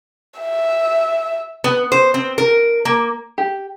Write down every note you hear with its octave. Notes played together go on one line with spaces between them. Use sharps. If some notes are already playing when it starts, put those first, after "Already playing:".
E5
B3
C5
C4
A#4
A#3
G4